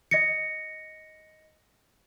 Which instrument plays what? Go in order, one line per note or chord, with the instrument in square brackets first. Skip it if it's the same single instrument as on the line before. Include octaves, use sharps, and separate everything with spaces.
[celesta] D#5 A#6 C#7